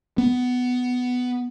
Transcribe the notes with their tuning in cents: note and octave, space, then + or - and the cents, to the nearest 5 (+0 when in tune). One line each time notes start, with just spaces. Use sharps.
B3 +10